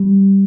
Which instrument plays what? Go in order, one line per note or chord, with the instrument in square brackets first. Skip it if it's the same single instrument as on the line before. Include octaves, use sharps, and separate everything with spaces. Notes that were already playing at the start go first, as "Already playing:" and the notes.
Already playing: [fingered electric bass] G3